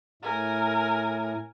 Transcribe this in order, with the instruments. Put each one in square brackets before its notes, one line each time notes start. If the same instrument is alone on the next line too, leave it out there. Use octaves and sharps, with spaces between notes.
[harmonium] A2 [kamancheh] A#4 G#5